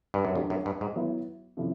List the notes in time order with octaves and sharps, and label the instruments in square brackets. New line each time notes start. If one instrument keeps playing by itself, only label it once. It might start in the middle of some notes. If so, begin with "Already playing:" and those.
[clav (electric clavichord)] G2
F#2
[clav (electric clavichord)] F2 [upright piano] F#3 A3 D4 G4
[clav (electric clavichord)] F#2
G2
G#2
[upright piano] F#3 B3 E4
C3 F3 A3 C#4 E4